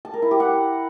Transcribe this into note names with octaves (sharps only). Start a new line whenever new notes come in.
A5
A#4
E4
G4
F#5